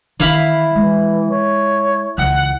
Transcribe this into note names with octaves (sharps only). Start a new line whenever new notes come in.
D#3 E3 E4 F5 B5
E3 G#3
C#5
C#2 E3 F#5